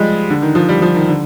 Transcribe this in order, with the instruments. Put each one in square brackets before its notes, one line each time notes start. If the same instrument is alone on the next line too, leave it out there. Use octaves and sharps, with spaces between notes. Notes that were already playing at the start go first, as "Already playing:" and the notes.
Already playing: [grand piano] F3 G3 G#3
D3
D#3
F3
G3
F3
D#3
D3